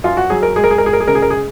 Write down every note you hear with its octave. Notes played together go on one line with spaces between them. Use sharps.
F#2 F4
F#4
F#3 G#4
A#4
G#3 G#4
A#4
G#4
A#4
G#3 G#4
A#4
G#4
C#3 A#4
G#4
A#4
G#4